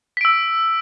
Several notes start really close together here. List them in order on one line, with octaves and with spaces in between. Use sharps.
B6 D7 E6